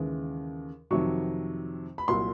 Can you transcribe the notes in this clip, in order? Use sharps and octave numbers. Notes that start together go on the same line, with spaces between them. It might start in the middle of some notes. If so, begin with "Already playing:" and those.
Already playing: D#2 C#3 E3 G#3
F2 C3 D#3 F#3 C#6
B5
C2 A#2 F#3 C6